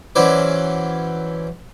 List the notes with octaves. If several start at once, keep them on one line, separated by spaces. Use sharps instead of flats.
E3 F#3 C#4 E4 C5 D5